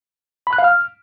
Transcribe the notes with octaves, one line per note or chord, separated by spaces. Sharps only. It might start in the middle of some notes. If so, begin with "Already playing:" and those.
B5
F#6
F5
F6